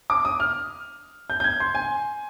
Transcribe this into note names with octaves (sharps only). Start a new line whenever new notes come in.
D6
D#6
F6
G6
G6
G#6
C6
G#5